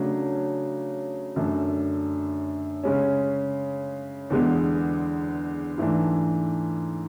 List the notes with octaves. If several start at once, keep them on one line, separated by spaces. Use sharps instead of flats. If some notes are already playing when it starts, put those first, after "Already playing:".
Already playing: C#3 F#3 A3 D4
F#2 D3 A3 D4
C#3 G#3 C#4
E2 D3 G#3 B3
G#2 E3 A3 D4